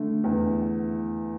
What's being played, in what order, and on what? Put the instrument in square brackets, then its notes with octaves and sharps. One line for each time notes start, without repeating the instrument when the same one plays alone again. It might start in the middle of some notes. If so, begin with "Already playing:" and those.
Already playing: [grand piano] D3 A3
E2